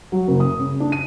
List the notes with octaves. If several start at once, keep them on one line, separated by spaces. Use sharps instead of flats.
F#3
F#1
D#6
C#3
D4
D#7